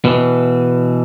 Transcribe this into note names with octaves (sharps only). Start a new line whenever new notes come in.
B2 E3